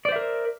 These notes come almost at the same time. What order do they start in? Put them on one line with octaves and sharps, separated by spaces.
D5 C5 E5 A#4